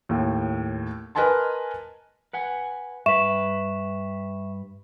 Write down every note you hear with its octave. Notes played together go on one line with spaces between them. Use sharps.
D#2 A2
A#4 B4 D#5 G#5 A5 C6
B4 F#5 G#5
G2 B4 E5 C#6 E7